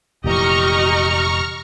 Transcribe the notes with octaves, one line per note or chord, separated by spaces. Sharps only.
F1 A#2 E3 G4 D#5 A#5 C#6 F6